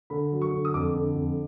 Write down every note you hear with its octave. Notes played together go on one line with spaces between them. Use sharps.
D3 B5
F#3
C#6
D3
D#6
F2 D6
D3
F2